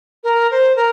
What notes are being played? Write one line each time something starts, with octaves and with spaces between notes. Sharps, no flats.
A#4
C5
A#4